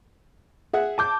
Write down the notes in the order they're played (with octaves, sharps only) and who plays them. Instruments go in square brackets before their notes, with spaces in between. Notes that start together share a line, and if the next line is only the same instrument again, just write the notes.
[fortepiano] G#4 E5 F#5
[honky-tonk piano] A5 D6 G6